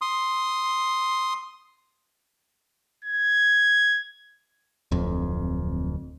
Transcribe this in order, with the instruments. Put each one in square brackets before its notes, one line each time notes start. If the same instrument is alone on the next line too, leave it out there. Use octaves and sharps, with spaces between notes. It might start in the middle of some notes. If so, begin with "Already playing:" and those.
[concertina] C6 D#6
[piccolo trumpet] G#6
[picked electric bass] D1 F2